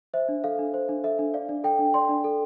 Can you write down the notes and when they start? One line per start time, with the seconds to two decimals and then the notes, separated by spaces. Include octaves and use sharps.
0.14 C5 E5
0.29 D4
0.44 A4 F5
0.59 D4
0.74 C5
0.89 D4
1.04 A4 E5
1.19 D4
1.34 D5 F5
1.49 D4
1.64 A4 G5
1.79 D4
1.94 D5 C6
2.09 D4
2.24 A4